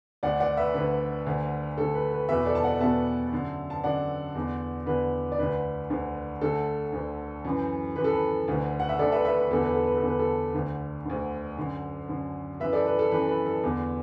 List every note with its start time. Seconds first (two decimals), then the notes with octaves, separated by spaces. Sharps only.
0.23 D2 D3 D5 F#5
0.40 D5 F#5
0.57 B4 E5
0.74 D2 D3 B4
1.26 D2 D3
1.78 D2 D3 A4
1.94 B4
2.12 B4
2.29 E2 B2 B4 E5
2.46 A4 D5
2.55 A5
2.63 D5 F#5
2.80 E2 B2 E5 A5
3.33 F#2 D3
3.70 A5
3.84 F#2 D3 D5 F#5
4.35 E2 D3
4.86 E2 D3 B4
5.32 D5
5.39 D2 D3 B4
5.90 D2 D3
6.41 D2 D3 A4
6.92 D2 D3
7.45 F#2 E3
7.96 F#2 E3 B4
8.04 A4
8.13 B4
8.48 D2 D3
8.80 F#5
8.89 E5
8.99 D2 D3 A4 D5
9.12 B4 E5
9.25 B4 E5
9.38 B4
9.51 E2 D3 A4
9.62 B4
9.74 A4
9.85 B4
9.96 A4
10.02 E2 D3
10.08 B4
10.19 A4
10.54 D2 D3
11.05 D2 D3
11.57 F#2 D3
12.08 F#2 D3
12.60 F#2 E3 B4 E5
12.73 A4 D5
12.86 B4
12.99 A4
13.11 F#2 E3 B4
13.29 B4
13.46 A4
13.64 E2 D3